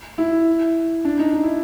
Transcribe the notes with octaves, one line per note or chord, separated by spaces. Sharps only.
E4
D4
D#4
D#4
E4